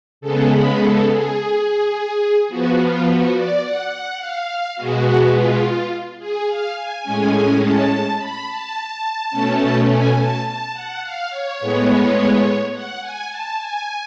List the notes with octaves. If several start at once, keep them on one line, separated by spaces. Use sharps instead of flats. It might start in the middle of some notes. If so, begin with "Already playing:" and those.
C#3 G#3 B3 A4
B4
A4
G#4
F3 B3 F#4
F4
F#4
D5
F#5
F#5
F5
B2 G#3 B3 F#4
F4
G#4
F5
G#5
A2 G#3 C#4 G#5
A5
B5
A5
B2 A3 C#4
G#5
A5
A5
F#5
F5
C#5
A2 G#3 B3
F#5
G#5
A5
G#5